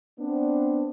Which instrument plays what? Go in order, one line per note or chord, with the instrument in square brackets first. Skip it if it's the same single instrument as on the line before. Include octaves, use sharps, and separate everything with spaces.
[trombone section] B3 C4 D4